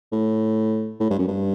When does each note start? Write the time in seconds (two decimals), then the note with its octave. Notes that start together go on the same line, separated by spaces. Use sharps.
0.12 A2
1.00 A2
1.10 G2
1.19 F#2
1.28 G2